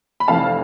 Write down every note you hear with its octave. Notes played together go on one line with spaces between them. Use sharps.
B5
F1 F2 E3 F5 A5